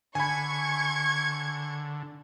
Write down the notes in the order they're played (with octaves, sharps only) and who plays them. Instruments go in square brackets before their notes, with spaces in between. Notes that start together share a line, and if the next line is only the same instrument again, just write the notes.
[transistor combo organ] D3 [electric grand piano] G#5 B5 [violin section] C#6 G#6